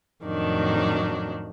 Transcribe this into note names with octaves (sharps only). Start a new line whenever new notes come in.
F2 A2 D#3 F#3 D4